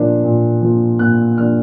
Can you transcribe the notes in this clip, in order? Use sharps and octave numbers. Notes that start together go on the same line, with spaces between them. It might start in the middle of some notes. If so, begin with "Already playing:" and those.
Already playing: A#2 F3 A#3 D4
A#2
F3 A#3 D4
A#2 F#6
F3 A#3 D4 F6